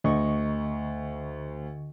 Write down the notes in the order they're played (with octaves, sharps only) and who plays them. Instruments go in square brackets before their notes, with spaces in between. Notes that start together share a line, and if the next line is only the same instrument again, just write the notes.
[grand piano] D2 [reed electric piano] D3 D#5 C#6